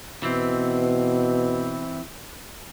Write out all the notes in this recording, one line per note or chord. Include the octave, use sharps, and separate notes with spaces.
B2 E3 C4